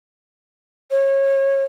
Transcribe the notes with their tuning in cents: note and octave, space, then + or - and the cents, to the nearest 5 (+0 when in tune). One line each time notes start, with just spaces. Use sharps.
C#5 -25